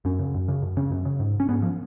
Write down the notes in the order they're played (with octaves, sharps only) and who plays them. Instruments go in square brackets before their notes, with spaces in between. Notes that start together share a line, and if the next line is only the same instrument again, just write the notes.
[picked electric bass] F#2 C#4
C#3
F#2
C#3
F#2
C#3 C#4
F#2
C#3
G#2
C#4
G#2 B3
F3